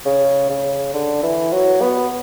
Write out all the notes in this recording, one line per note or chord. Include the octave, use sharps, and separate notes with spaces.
C#3
C#3
D3
E3
F#3
B3